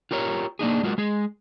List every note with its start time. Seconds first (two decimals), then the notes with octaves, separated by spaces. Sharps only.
0.11 F4 G4 A#4 C#5
0.59 A#3 D4 D#4 G#4
0.83 G#3 F4 F#4 A#4
0.98 G#3 G#4